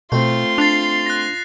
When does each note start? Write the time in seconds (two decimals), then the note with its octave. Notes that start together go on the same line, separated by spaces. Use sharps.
0.12 B2 A3 C4 F4 C6
0.58 D4 A6 C7 F7
1.06 F#6 A#6